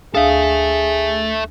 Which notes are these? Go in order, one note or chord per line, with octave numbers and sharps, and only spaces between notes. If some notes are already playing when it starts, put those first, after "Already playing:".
D2 G#4 A4 E5 F5 D#6